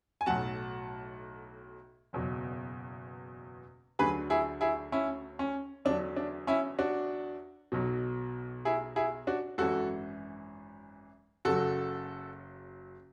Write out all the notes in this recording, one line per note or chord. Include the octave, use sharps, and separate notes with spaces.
G#5
B1 A2 F#3 F#5 A5
F#1 E2 B2 F#3
D2 D3 F#3 G#4 B4
E4 G#4
E4 G#4
C#4 E4
C#4
E2 D3 F#3 D4
D4
C#4 E4
D4 F#4
B1 B2 F#3
E4 G#4
E4 G#4
D4 F#4
G#1 F#2 E3 F#4 A4
F#1 F#2 C#3 F#3 F#4 A4